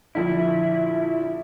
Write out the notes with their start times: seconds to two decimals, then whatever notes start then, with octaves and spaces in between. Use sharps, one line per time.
0.15 A#1 D3 E4